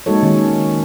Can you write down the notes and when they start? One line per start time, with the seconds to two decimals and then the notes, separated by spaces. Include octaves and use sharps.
0.06 G#3 A#3 D#4 F#4 A4 C#5
0.23 D#3 C#4 C#5